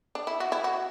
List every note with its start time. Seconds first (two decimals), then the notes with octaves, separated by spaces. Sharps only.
0.15 D4
0.27 E4
0.40 F#4
0.52 E4
0.64 F#4